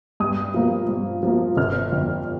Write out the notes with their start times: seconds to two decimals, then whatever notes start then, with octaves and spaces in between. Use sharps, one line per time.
0.20 G2 D#6
0.54 F3 A#3
0.89 G2
1.23 F3 A#3
1.57 G1 F6
1.92 F2 D3